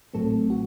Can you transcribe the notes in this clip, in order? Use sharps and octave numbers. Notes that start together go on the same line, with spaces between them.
A1 A2 F#3 A3 C4 A4
F#4